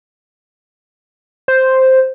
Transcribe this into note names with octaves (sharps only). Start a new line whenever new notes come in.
C5